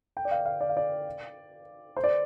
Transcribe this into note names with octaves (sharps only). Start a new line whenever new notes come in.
G5
D5
F5
F5
D5
F5
D5
C5
D5